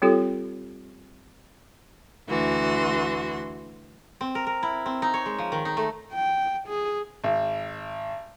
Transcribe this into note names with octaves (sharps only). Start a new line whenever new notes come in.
G3 C4 F4 G4 A4
D2 E3 F#4 C6
C4
A#4
A#4
E4
C4
D#4
C#5
G#3
F3
D#3
D#4
A3
G5
G#4
G#1